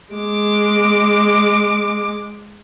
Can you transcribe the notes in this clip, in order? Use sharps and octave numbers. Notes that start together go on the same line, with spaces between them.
G#3 D6